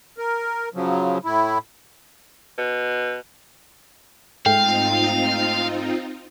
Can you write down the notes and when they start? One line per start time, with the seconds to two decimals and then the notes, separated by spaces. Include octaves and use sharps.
0.18 A#4
0.74 C#3 F3 F#3
1.25 A2 E4
2.58 B2
4.46 G#2 A3 C4 D#4 F4 F5 G5